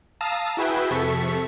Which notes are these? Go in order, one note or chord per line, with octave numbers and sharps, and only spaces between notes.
F5 A5 A#5 D#6 E6
E4 F#4 G#4 B4 E5 G5
F2 C3 A4 C#6 B6